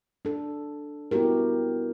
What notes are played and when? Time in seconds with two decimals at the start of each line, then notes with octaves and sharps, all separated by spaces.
0.25 D4 A4
1.11 B3 E4 F#4 G4 A#4